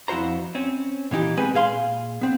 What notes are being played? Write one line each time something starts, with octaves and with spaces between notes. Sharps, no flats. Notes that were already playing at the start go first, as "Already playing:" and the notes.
F2 E4 F#4 C5 A#5
C4 C#4
A#2 E3 D#4 G4
B2 G#3 C4 B4 G#5
A#2 G#4 F5 C6
B3 C4